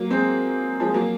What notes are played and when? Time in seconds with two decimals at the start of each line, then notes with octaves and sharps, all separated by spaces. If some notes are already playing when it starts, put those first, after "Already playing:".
Already playing: F#3 A#3
0.10 G#3 C4
0.80 F3 G#3
0.94 F#3 A#3